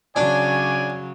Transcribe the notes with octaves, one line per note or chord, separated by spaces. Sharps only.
C#3 F#3 D4 C#5 D5 G#5